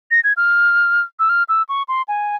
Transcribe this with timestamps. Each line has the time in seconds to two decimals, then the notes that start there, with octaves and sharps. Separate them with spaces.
0.11 A#6
0.24 G#6
0.37 F6
1.19 E6
1.29 F6
1.49 E6
1.69 C#6
1.88 C6
2.08 G#5